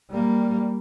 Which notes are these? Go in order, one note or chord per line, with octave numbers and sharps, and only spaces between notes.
G3 A#3